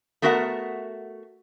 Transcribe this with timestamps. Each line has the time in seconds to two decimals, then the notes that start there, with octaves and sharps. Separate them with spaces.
0.22 A3 B3 F#4 A#4 E5 F#5